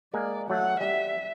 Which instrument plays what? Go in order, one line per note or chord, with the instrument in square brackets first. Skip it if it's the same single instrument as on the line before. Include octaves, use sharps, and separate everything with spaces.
[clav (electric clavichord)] G#3 A#3 G#5 [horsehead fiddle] D5
[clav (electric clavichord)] F#3 A3 [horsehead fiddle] F#5
[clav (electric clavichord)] G3 [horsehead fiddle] E5